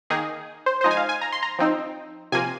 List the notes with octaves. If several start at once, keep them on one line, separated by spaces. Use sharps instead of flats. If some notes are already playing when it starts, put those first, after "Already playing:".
D#3 A#3 D#4 G#4
C5
C5
F3 G#3 D#4 D#5
G#5
F5
G#5
A#5
C6
A#5
F3 C4 D#4
C3 F3 A#3 G#5